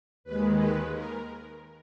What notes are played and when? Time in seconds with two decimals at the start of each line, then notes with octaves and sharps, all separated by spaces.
0.24 D#2 D#3 G#3 B4
0.58 B4
0.93 A#4